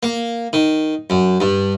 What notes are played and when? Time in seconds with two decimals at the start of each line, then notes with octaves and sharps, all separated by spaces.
0.03 A#3
0.53 D#3
1.10 F#2
1.40 G2